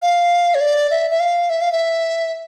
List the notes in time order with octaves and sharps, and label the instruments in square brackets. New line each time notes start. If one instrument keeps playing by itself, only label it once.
[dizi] F5
C#5
D5
E5
E5
F5
E5
F5
E5